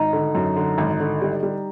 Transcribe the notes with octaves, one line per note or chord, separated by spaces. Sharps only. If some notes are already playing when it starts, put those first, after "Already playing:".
Already playing: G#1 D#4
D3
F#2
D3
G#1
D3
G3
G3